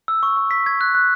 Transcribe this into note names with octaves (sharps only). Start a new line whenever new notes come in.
E6
C#6
C#6
B6
G#6
F#6
F#6